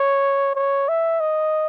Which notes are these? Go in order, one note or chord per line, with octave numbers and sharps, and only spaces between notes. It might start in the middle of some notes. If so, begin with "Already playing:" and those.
Already playing: C#5
C#5
E5
D#5